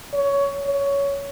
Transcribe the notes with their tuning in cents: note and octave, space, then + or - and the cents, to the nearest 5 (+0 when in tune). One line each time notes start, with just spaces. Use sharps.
C#5 +20
C#5 +15